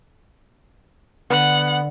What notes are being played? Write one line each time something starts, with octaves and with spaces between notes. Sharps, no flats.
D3 B3 F#5